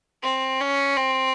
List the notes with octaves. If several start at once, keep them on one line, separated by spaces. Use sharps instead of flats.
C4
C#4
C4